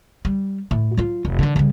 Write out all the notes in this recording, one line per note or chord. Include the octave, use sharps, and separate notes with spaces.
G3
A2
F#3 F4
F1
D3 D#3
C#3 G3